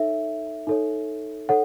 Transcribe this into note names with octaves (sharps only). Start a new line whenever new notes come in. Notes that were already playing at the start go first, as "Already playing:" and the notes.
Already playing: D#4 A4 C#5 E5
D#4 A4 C#5
D#4 A4 C#5 F#5